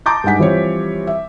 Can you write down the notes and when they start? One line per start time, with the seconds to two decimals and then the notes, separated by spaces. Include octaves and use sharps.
0.06 A5 A#5 C6 D6 G6 A6
0.24 G2 G#3 D#4 F#5 B6
0.39 E3 F3 G3 C4 G4 C#5
1.07 E5